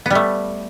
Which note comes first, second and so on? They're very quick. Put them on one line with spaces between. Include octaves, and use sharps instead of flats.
B3 G3 A3